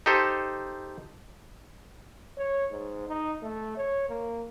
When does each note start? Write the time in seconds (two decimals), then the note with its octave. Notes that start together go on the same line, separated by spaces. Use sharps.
0.06 D#4 G4 A4 C5
2.38 C#5
2.71 G#2
3.08 D#4
3.42 A3
3.77 C#5
4.09 A#3